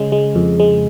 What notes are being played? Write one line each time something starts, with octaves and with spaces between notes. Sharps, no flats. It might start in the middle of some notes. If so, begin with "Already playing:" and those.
Already playing: C#3 G#3
G#3
F2
G#3